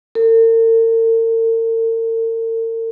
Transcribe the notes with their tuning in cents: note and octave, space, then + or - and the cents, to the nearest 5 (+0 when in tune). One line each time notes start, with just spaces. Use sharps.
A#4 -45